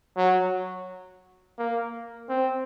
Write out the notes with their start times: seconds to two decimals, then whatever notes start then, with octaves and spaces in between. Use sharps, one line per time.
0.17 F#3
1.59 A#3
2.29 C4